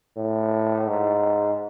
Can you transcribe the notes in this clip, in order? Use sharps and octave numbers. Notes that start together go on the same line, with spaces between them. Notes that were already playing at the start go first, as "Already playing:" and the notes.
A2
G#2